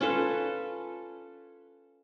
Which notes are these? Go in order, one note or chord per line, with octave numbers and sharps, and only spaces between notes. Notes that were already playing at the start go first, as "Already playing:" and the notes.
C#4 F4 A4 B4